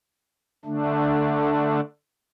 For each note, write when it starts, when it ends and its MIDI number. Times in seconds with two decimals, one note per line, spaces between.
0.65 1.80 50
0.65 1.80 57
0.65 1.80 62